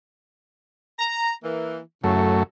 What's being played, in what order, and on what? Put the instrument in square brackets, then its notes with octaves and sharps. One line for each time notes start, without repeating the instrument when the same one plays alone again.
[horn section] A#5
E3 A#3
[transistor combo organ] F#2 A3 [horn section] A2 C#3